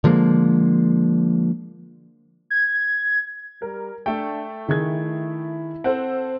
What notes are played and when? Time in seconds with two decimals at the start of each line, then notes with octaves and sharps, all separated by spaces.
0.04 D3 F3 G#3 A#3
2.50 G#6
3.62 G3 A#4
4.06 A3 D4 A4 G5
4.68 D#3 E4 G#4 G#6
5.84 C4 A4 C5 F#5